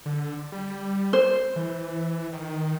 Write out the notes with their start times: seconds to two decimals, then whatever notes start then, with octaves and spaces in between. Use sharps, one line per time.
0.06 D3
0.52 G3
1.13 C5
1.56 E3
2.32 D#3